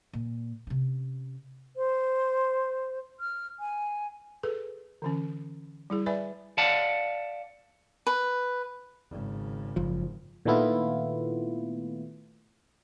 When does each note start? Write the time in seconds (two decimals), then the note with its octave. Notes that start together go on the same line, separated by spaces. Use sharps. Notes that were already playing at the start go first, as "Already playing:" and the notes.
0.13 A#2
0.67 C3 C#4
1.76 C5
3.20 F6
3.60 G#5
4.43 G#4 A4 B4
5.02 D3 E3 C#4
5.90 G3 E4 G#4
6.06 B4 D5 E5 G#5 B5
6.58 D5 F5 F#5 A5
8.07 B4
9.10 G#1 C#3
9.76 F#1 F3
10.46 A#2 D#3 A3 B3 E4 F4